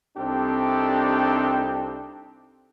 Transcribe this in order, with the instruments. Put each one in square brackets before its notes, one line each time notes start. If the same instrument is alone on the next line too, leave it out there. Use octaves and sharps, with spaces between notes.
[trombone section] C2 C4 D4 D#4 G4 A4